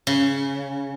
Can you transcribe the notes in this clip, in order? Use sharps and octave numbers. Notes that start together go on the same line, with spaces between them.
C#3